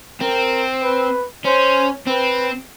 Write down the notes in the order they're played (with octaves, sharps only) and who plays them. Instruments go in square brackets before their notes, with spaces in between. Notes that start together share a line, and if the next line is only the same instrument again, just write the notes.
[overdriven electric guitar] C4 [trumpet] A#4
[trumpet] B4
[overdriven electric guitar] C#4 [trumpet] C5
[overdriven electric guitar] C4 [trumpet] B4